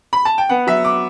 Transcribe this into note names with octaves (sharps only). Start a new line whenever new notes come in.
B5
A5
G5
B3 F#5
F#3 E5
D6